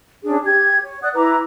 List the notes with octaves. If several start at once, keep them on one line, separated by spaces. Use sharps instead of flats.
C#4 D4 G#4
G4 G#6
C#5
D5 F#5 D#6 F#6
E4 B4 A#5 D6